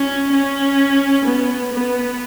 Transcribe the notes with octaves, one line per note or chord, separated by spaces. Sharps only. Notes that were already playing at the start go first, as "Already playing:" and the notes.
Already playing: C#4
C#4
B3
B3